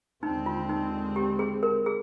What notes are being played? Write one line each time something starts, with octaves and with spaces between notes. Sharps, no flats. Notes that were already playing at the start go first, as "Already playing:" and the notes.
D#2 D3 G#3 C4 D#4
F4
D#4
G4
G#4
A#4
G#4